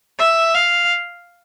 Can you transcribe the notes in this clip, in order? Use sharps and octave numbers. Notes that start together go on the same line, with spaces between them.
E5
F5